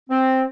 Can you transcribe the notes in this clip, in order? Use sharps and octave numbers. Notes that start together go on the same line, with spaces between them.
C4